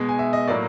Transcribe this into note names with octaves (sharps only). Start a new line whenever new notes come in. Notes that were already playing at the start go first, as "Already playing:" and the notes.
Already playing: B2 G#3
G#5
E5
D#5
A2 F#3 A#3 D5